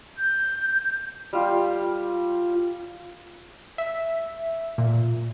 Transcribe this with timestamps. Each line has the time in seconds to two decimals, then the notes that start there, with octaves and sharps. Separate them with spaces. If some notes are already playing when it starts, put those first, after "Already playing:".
0.16 G6
1.33 G3 F4
3.78 E5
4.78 A#2